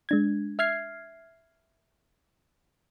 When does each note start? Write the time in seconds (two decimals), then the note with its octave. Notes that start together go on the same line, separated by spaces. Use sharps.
0.09 G#3 D4 G#6
0.59 E5 F6 G#6 C7